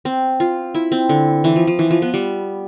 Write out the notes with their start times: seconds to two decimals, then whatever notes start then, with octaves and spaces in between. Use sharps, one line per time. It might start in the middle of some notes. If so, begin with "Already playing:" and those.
0.05 C4
0.40 F4
0.75 E4
0.92 C4
1.09 D3
1.44 E3
1.56 F3
1.67 F3
1.79 E3
1.91 F3
2.02 B3
2.14 G3